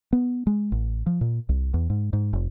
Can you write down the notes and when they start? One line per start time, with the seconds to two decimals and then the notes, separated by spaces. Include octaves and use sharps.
0.13 B3
0.47 G#3
0.72 A1
1.06 F3
1.21 A#2
1.49 C2
1.74 E2
1.90 G#2
2.13 G#2
2.33 F1